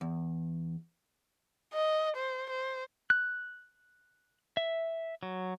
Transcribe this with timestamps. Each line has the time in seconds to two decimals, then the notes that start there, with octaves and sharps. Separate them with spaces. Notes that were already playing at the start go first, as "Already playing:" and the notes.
0.01 E2
1.73 D#5
2.17 C5
2.50 C5
3.10 F#6
4.57 E5
5.23 F#3